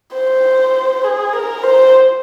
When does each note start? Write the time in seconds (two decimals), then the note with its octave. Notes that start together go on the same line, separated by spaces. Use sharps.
0.14 C5
1.04 G#4
1.33 A#4
1.63 C5